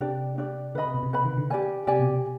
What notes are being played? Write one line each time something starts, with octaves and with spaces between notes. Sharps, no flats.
C3 D4 G4 D5
D4 G4 D5
D3 B4 D#5 B5
C3
B2
C3
B4 D#5 B5
D#3
D3
G4 D5 G#5
C3 G4 D5 G#5
B2
B2